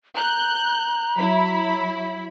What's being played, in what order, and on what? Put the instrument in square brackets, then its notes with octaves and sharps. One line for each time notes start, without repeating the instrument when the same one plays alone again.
[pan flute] A#5 [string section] F#6 G6
[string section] F#3 E4 B5